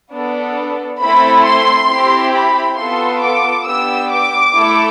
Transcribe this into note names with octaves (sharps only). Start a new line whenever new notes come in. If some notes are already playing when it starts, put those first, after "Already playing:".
B3 D4 A4
A3 C4 E4 A4 B5
C6
C4 E4 G4
B5
B3 F4 A4 C6
D6
B3 D4 G4 E6
D6
A3 E4 A4